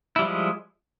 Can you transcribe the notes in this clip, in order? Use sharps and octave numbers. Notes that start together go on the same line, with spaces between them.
F3 G3 G#3 E4